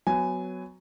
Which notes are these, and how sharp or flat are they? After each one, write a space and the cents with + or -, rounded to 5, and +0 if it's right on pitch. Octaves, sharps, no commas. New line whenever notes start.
F#3 +0 B3 +25 G#5 +0